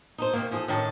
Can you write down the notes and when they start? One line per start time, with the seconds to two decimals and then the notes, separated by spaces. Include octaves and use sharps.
0.18 D#4 A4 C5
0.33 C3 D#3 A#3
0.51 E3 F3 G#4 A4
0.68 A2 D#3 C#4 A5